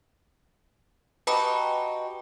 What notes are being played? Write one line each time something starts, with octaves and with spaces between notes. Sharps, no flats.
D#4 F#4 G4 B4 A5 B5